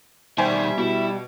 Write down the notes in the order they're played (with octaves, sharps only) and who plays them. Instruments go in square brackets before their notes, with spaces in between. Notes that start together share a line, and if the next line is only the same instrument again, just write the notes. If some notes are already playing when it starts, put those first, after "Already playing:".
[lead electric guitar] B2 D#3 [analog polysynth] G3 [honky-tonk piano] C5 G#5 [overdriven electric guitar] E5
[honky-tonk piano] B2 [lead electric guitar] E4